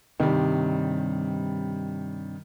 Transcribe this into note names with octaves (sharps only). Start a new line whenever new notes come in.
G2 C3 D#3 G3